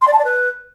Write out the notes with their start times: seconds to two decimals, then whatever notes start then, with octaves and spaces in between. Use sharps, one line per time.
0.01 C6
0.07 D5
0.13 A5
0.19 D5
0.24 B4